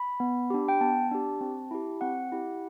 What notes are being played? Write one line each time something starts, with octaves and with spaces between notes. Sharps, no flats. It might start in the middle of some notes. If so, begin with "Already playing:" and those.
Already playing: B5
B3
D4 G4
G5
B3 A5
D4 G4
C4
E4 G4
C4 F#5
E4 G4